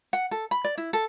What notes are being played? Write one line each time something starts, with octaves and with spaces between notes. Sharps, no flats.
F#5
A4
B5
D5
E4
A4